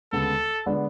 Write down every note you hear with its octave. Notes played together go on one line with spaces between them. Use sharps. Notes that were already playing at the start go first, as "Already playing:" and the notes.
D2 C#3 G#3 B3 A4
D3 G#3 B3 D4